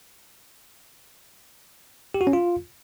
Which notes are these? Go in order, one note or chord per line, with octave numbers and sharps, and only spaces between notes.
G4
F#4
C#4
F4